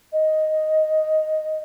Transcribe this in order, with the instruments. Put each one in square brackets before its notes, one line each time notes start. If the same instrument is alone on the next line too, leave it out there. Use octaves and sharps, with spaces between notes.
[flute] D#5